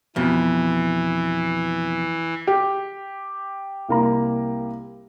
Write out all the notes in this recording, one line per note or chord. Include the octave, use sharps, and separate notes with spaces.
F2 B2 E3
G4
C2 A#3 A#5